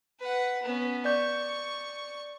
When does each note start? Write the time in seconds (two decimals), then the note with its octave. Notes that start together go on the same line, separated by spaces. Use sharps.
0.20 B4 F#5
0.63 B3 C#4
1.05 D5 C#6 G6